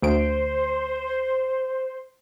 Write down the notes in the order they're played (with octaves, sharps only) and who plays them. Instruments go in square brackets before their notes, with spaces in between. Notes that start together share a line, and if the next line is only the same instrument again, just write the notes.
[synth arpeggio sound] D2 D7 [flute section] C5